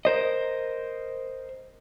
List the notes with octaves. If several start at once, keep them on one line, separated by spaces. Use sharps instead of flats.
A#4 C5 D#5